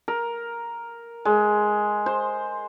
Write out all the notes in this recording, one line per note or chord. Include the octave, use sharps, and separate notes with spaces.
A#4
G#3
C5